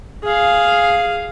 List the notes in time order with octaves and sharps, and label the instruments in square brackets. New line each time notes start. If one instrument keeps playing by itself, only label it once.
[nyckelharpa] G#4 F5